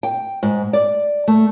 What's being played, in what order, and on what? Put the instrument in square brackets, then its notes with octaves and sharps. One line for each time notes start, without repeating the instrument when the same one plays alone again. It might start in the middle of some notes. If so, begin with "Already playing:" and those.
[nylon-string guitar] G5
G#2
D5
A3